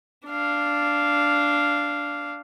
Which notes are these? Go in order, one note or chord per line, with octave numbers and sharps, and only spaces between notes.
D4 F5